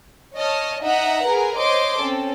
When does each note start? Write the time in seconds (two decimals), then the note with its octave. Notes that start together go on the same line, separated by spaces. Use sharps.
0.35 C#5 D#5 A5 F6
0.83 D#4 D#5 E5 F#5 A#5
1.23 G#4 A#4 B4
1.57 C5 C#5 D#5 C6 D6
1.99 C4 C#4 A4